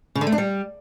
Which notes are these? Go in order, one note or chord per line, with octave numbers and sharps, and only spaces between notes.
C#3
D3
A3
D4
G3